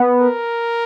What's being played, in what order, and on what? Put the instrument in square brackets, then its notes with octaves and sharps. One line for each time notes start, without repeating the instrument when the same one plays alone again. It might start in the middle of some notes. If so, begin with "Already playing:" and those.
Already playing: [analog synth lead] B3
[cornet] A#4